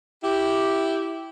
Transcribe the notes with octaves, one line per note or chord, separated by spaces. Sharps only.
E4 G4